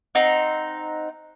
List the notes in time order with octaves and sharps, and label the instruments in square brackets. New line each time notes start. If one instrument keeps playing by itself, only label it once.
[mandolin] C4 D#4 F#5